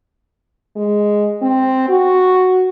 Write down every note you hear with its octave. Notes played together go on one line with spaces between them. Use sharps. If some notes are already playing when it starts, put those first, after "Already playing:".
G#3
C4
F#4